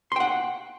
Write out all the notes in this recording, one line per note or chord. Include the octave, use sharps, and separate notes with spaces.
F#5 G5 C6